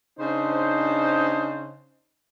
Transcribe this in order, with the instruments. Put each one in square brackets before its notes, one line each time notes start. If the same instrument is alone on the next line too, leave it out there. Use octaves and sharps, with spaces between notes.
[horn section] C#3 D4 D#4 C5